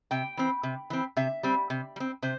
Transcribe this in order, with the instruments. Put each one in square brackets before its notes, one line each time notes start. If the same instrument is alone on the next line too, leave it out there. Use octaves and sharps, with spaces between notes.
[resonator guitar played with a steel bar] C3 G5
E3 C4
C3
E3 C4
C3 E5
G3 C4
C3
G3
C4
C3 C5